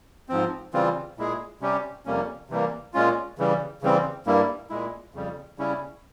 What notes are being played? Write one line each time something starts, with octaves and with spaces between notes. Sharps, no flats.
G#2 F3 C4
C#3 E3 G3 C4 F4
A#2 G#3 E4 G#4
C3 G3 C#4 G4
F2 C3 G3 A#3 C#4
C3 E3 G3 A#3
A#2 G#3 C#4 F4
C#3 E3 G3
C#3 E3 G3 C4
G2 G3 A#3 E4
A#2 G#3 E4
F2 C#3 G3
C#3 G3 C#4 E4